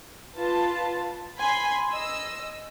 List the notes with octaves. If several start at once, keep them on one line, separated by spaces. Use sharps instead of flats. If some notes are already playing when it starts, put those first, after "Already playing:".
F4 B4 A5
G#5 B5 C6
D#5 E6